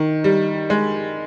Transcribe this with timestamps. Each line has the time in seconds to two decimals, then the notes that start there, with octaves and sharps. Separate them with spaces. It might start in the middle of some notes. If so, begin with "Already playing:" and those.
Already playing: D#3
0.24 G3
0.70 G#3